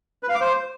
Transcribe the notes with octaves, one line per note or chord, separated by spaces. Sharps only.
B4
F5
D6
C5